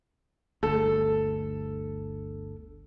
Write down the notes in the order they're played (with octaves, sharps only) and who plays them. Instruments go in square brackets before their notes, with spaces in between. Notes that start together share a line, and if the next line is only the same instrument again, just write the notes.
[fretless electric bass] G1 D2 [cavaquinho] A4